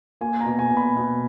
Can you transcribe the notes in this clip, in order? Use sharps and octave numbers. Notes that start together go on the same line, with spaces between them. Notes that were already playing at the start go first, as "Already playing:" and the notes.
A#3 G#5
A#5
B2
G#5
B2
B5
B2